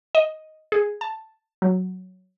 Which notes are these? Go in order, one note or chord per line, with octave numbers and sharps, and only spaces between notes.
D#5
G#4
A5
F#3